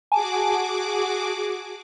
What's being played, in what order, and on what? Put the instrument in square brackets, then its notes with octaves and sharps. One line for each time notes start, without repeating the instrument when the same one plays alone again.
[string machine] F#4 G#4 D6 [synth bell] G#5 A5